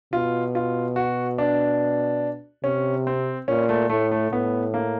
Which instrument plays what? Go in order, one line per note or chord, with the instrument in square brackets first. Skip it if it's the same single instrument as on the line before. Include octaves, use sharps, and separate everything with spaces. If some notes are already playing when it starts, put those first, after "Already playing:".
[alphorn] B2 [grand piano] F4
[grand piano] F4
F#4
D4
[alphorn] C3 [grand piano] C#4
[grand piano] C4
[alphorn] A#2 [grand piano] C#4
[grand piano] A3
[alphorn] A2 [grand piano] A3
[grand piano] A3
[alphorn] A2 [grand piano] B3
[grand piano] A#3